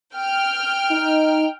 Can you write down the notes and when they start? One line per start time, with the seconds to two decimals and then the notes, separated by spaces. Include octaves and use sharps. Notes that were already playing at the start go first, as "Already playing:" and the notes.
0.16 G5 F6
0.91 D#4